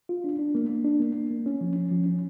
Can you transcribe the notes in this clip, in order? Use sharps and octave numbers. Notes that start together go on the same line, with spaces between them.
F4
D4
D4
A#3
A#3
D4
A#3
A#3
A#3
C#4
F3
C#4
F3
C#4